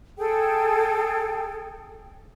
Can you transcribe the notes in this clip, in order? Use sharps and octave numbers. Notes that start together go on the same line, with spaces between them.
G#4 A4 G5